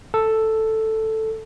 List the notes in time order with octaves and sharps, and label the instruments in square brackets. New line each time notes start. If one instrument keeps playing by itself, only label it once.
[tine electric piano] A4